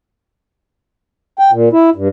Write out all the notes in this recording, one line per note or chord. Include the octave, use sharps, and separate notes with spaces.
G5
A#2
E4
G2